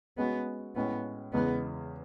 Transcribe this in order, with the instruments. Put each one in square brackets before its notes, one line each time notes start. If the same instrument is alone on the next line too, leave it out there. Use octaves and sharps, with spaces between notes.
[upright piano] G#3 C#4 F#4 [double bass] B3
[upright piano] A2 G#3 C#4 [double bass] B3
[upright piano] E2 C#3 G#3 [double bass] B3